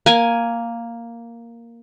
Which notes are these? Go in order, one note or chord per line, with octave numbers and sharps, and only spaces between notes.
A#3 G#5